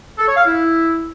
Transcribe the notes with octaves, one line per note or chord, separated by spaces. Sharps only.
A4
C#5
F5
E4